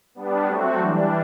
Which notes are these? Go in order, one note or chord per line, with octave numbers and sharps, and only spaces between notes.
G3 B3 D4
F#3 A3 C4 F#4
E3 G3 D4